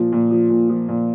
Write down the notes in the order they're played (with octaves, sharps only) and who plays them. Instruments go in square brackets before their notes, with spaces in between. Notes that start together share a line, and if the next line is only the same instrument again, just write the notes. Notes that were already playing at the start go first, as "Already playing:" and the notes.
Already playing: [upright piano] A#2 F3
A#2
F3
A#2
F3
A#2